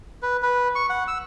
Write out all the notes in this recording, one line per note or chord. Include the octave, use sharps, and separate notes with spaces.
B4
B4
C#6
F#5
E6